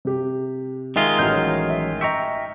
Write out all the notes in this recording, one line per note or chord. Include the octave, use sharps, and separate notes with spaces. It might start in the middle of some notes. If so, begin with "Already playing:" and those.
C3 G4
D#3 G#3 F4 E5
A1 A2 F#3 F6 G6
E5
D#5 E5 G5 A#5 C#6 C#7